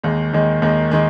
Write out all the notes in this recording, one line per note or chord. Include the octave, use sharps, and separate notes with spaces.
D#2 D#3 G#3
D#2 D#3 G#3
D#2 D#3 G#3
D#3 G#3